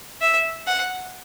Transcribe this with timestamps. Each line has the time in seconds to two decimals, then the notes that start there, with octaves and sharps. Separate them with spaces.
0.21 E5
0.67 F#5